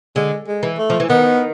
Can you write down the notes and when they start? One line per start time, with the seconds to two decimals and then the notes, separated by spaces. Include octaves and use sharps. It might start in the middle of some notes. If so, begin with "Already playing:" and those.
0.16 D3 G#3
0.48 G#3
0.63 E3
0.78 A3
0.90 F3
1.00 E3
1.09 D#3 B3